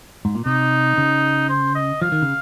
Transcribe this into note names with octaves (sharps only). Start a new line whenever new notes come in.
G#2
A#2
C3 D#4
C#3
C5
D#5
F3 F5
D#3
C#3